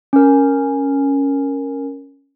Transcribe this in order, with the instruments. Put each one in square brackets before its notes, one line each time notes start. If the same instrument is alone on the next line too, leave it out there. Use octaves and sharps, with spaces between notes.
[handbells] C#4 A#4